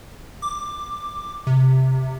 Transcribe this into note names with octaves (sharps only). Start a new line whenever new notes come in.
D6
C3